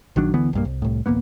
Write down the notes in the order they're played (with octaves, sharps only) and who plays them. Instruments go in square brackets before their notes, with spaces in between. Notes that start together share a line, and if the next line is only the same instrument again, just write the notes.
[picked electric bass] A#1 D#3 F#3 D4
D2 D3 E3 B3
B1 G2 A#3
C2
C2 A2
D1 A1 A#3 B3